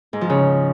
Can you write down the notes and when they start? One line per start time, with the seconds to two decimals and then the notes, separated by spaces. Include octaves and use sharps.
0.13 G#2
0.21 F3
0.30 C#3